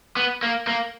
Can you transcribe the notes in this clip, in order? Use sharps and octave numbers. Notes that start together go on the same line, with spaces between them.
B3
A#3
A#3